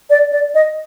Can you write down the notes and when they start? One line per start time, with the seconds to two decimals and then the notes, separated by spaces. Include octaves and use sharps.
0.10 D5
0.32 D5
0.55 D#5